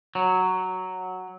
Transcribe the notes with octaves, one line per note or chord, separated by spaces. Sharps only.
F#3